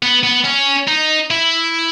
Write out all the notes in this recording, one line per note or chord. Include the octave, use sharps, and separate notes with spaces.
B3
B3
C#4
D#4
E4